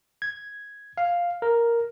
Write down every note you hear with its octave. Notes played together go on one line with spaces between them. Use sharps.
G#6
F5
A#4